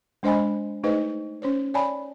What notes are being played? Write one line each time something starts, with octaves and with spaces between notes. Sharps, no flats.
G#3 D4 C5 D#5 G#5 B5
A3 D#4 G#4 B4 C5 D#5
C#4 C5 C#5
C#5 D5 G#5 A5 B5